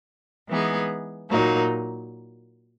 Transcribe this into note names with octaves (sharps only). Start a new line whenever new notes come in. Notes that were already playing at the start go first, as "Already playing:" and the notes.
E3 G#3 B3 D#4 G#4
A#2 F#3 A#3 D#4